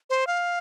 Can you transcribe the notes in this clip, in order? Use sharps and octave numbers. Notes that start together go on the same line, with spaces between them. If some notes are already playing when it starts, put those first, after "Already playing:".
C5
F5